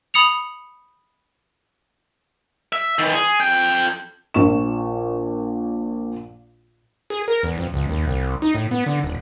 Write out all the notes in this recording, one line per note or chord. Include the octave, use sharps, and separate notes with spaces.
B5 D#6 C#7 F7
E5
D#3 E3
G#4
F2 G5
A#1 A#2 C#6 E7
G#4
A#4
E2
F2
C#2
D#2
C2
D#4
A2
B3
D3
D#1